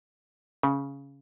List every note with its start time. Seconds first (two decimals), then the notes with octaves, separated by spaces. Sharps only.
0.63 C#3